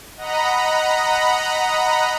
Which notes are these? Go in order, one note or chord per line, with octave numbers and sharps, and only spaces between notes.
D#5 F#5 A#5 B5